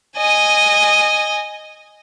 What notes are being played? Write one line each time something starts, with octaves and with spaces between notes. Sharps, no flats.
D#5 G#5